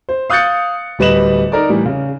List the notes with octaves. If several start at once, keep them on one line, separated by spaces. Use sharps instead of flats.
C5
F5 D#6 F#6 G6 A6 C#7
D1 G3 B4 D#5 E7 F#7
D#4 A#4 D5
A2 E3 G3
C#3